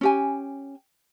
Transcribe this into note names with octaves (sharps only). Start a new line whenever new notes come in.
C#4 G4 G#5